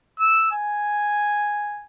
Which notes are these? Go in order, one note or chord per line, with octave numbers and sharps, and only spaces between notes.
E6
G#5